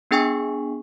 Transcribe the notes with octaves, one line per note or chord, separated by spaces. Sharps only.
B3 D4 G#4 G5 G#5 C#6